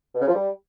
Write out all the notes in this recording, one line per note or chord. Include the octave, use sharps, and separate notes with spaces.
B2
C#3
F3
G3